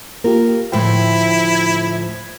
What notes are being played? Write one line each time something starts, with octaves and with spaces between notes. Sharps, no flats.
A#3 F4 G4 A#4
D2 A2 F3 E4 G5
G#6